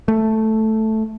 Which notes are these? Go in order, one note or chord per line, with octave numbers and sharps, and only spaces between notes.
A3